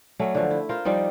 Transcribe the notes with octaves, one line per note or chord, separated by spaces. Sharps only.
F#3 A3 C#4 D5
D3 F3
E4
F4 A#4 C5 F5
F3 G3 D#4 D5